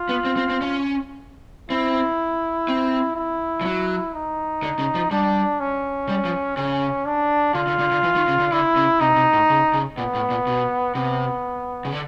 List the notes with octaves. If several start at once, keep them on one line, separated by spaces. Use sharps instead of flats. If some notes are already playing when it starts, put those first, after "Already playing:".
Already playing: F4
B3
C4
C4
C4
C#4
C4 E4
C4
E4
F3
F#3
D#4
D3
C#3
F3
G3 D4
C#4
G3
F3
C#3 C#4
D4
D3 F4
D3
D3
D3
E3
D#3
C#3
D3
D3 E4
C#3
C3 D#4
C3
A2
C#3
C#3
A#2 B3
A2
A#2
B2
C3 B3
C#3
D3